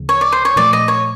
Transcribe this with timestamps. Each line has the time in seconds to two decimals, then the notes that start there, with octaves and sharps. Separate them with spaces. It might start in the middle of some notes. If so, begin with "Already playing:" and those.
Already playing: D2 C#3 F3
0.09 C#5
0.21 D5
0.32 C5
0.45 C#5
0.56 A#2 F3 A3 D5
0.73 D#5
0.88 C#5